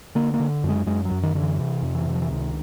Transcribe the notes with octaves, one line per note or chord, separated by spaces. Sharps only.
D3 A#3
A#3
D3
F#2 G#3
F#2 G#3
F#3
F#2
D#3
D3
E3
C3 E3
F2
E3
C3
F3
E3
C#2 D#3